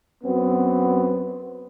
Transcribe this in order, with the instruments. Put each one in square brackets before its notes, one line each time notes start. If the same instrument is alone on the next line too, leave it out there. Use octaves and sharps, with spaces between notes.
[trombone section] F#2 B3 C4